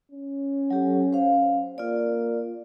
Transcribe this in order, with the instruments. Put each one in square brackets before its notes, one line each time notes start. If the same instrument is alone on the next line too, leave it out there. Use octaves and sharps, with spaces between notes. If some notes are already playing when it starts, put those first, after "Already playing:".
[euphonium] C#4
[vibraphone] F#3 G4 A4
C5 F5
[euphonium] A#3 [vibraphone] F4 D5